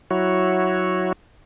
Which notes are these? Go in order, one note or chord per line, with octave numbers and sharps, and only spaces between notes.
F#3 E4 F#4 C#5